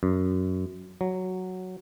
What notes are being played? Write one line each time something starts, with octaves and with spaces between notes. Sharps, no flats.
F#2
F#3